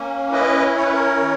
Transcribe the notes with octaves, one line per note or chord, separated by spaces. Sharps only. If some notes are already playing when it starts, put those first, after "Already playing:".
Already playing: A#3 C#4
E4 B4 D#5
C#4 C#5
B4
A#4 C#5
D#3